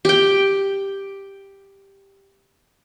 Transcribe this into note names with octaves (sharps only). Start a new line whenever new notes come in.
G4 G5